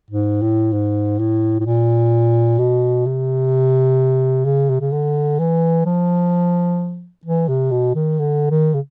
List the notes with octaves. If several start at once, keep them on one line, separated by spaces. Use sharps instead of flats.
G#2
A2
G#2
A2
A2
A#2
B2
C3
C#3
C3
C#3
D3
E3
F3
E3
C3
B2
D#3
D3
D#3
C#3